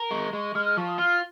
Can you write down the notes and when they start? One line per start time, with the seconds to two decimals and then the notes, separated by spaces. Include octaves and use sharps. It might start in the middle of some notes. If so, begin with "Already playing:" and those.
Already playing: A#4
0.11 G#3 C#6
0.33 G#3 C#6
0.55 G#3 F6
0.65 F6
0.77 F3 C#6
0.88 D#6
0.98 F4 F6